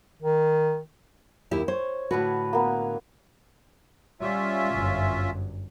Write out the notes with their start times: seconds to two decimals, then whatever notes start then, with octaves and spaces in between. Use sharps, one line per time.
0.22 D#3
1.51 D#2 E4 G4
1.68 C5 C#5
2.11 A2 D3 F#4 B4 A5
2.53 A#3 B3
4.21 G3 C#4 F4 E5
4.73 G1 F#2